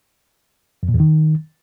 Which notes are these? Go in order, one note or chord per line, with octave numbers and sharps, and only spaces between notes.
F2
A#2
E2
D#3